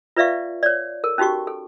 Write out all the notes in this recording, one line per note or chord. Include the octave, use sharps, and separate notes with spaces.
F4 B4 D5 E5 F5 C#6
C#5 D5
A4 A#4
C#4 D#4 F#4 G4 C#6
A4